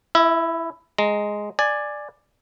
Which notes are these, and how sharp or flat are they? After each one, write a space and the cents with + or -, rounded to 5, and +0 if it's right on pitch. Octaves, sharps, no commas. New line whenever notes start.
E4 +10 E5 -35
G#3 +0 A#5 +0
D5 +10 G#5 +0